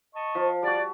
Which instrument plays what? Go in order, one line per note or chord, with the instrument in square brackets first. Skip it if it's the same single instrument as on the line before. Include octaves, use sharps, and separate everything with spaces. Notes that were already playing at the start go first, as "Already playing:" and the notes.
[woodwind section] D#5 A5 C#6
[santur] F3 F4
[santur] G3 F#4 [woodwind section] D5